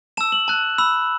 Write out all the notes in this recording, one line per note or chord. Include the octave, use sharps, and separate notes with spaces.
A5 E6 E7
F#7
A5 F#6
B5 E6